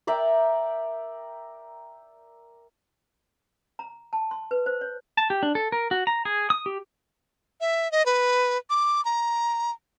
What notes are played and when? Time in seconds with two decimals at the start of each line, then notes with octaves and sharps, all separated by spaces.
0.07 A#4 D5 E5 G5
3.79 A#5
4.13 A5
4.31 C6
4.51 B4
4.66 C5
4.81 C#5
5.17 A5
5.30 G4
5.43 D4
5.55 A4
5.72 A#4
5.91 F#4
6.07 A#5
6.25 G#4
6.50 D#6
6.66 G4
7.61 E5
7.92 D#5
8.06 B4
8.70 D6
9.05 A#5